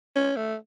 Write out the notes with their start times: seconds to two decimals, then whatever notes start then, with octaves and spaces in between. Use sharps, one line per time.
0.16 C#4
0.37 A3